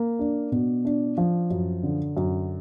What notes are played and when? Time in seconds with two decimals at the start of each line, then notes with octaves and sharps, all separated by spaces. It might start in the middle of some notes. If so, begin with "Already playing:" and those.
Already playing: A#3
0.19 D4
0.52 B2
0.85 D4
1.18 F3
1.50 F#2
1.83 D3
2.17 F#2